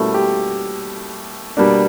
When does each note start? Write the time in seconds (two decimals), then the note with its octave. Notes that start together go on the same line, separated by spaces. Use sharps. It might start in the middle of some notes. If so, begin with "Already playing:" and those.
Already playing: B2 G3 A3 A#3 C#4 E4 A4
0.14 G4
1.57 B2 G3 A#3 D4